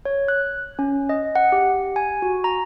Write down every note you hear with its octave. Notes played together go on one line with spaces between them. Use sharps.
C#5
F#6
C#4
D#5
F#5
G4
G#5
F#4
A#5